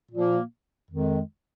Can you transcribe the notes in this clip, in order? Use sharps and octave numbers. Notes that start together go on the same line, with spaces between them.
A#2 F3 A#3
F2 D#3 G#3